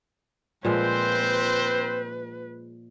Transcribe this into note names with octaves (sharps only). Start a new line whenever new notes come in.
A#2 F3 G#3 C4 B4 C5